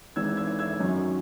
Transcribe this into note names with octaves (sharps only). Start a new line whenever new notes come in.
G#1 G#2 E3 E6 G#6
E6 G#6
E6 G#6
F#2 D#3 F#3 C#4